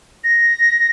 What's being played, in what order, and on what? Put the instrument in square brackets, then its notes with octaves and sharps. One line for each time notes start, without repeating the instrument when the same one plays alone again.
[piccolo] A#6